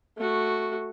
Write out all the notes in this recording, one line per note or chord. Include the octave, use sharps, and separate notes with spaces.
A3 F#4